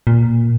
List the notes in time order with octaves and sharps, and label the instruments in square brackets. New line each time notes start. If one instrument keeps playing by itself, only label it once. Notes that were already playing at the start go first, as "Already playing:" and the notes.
[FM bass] A#2